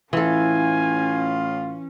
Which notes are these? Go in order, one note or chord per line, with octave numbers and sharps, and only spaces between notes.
A2 E3 C#4 F4 A4 G#5